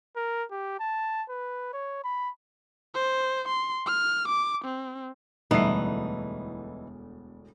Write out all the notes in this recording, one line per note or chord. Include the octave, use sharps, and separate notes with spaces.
A#4
G4
A5
B4
C#5
B5
C5
C6
F6
D6
C4
E1 D2 E3 G3 A3 B3 D#4 C7